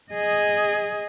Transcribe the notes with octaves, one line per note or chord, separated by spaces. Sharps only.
G#4 D#5